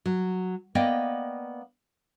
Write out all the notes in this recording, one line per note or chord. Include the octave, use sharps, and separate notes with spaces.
F#3
A#3 B3 D5 D#5 G5